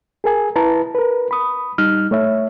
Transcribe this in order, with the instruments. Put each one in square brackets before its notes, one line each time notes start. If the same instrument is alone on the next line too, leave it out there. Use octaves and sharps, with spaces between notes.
[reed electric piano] G#4 A#4 G#5
E4 B4 A5 A#5
A#4 B4
B5 D#6
G3 D#4 F6
A3 C#5 E5